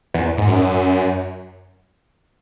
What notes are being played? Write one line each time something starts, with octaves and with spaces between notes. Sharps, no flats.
E2
G#2
F#2